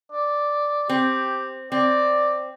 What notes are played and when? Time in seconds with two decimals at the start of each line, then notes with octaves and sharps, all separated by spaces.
0.12 D5
0.89 C4 G4
1.72 C4 D5